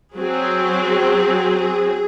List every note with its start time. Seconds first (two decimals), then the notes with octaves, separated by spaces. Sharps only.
0.16 F#3 C4 G#4